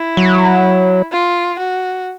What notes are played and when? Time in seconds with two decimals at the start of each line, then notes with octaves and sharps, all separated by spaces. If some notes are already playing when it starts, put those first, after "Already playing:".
Already playing: E4
0.17 F#3
1.12 F4
1.59 F#4